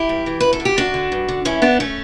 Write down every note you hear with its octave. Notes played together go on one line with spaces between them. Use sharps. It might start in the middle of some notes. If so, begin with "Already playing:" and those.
Already playing: E4 G4
G2
E3
F#2 B4
A4
D3
G4
F#2 D4 F#4
D3
G2
D3
G2 C#4 E4
D3 B3 D4
A3 C#4